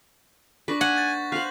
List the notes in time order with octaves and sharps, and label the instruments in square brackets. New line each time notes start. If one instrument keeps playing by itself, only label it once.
[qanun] D4 B4 [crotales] C#6 A#6 B6
[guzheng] F#5 [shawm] G#5
[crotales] G6 A6
[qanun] B4 C5 [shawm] F5 [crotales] F#6 F#7